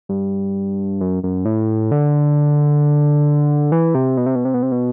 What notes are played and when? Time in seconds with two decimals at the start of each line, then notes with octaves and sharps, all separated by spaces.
0.09 G2
1.01 F#2
1.23 F#2
1.45 A2
1.91 D3
3.72 E3
3.95 C3
4.17 B2
4.26 C3
4.35 B2
4.45 C3
4.54 B2
4.63 C3
4.72 B2